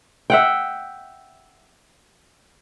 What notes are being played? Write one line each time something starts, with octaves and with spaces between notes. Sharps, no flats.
E5 F#5 G5